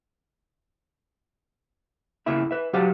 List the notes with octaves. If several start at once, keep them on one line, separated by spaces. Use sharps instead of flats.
E2 C#3 A#3 E4 E5 B5
B4 E5
F#3 G4 C5 F5 F#5 A5